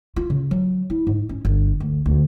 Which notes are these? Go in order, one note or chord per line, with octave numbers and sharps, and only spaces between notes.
F4
C#3
F#3
E4
G#2
C#4
G1
D2
D2